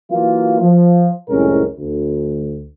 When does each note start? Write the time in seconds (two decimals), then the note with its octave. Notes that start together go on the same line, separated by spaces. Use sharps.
0.11 E3 F#3 A#3 F4
0.61 F3
1.29 C2 F2 A2 G#3 C#4 A#4
1.78 D2